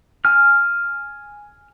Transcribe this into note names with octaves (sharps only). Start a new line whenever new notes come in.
G#5 F6